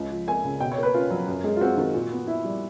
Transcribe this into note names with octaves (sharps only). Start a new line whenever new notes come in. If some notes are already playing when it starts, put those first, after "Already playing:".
Already playing: C#2
F3
A#3 G#5
C#3
B2 G5
C#5
A#3 B4
C#4 F4
F#3
F#2
G#3
F4
C4 F#4
D#3
A#2
B3
E4
G3